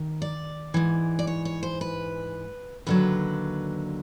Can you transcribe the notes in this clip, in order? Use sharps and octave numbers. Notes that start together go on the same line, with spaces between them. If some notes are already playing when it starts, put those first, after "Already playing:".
Already playing: D#3
D5
G#2 E3
D5
C#5
C#5
C5
B4
D#2 D3 F#3 B4